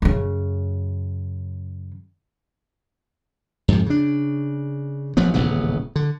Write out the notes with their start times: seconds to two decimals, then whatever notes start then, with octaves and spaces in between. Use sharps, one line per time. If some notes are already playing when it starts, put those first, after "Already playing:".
0.02 F#2 C#3
3.68 F2 G#2 C3
3.86 C#3 D4
5.17 A1 F3 F#3 B3
5.34 D#1 A1 C#3 B3
5.96 D3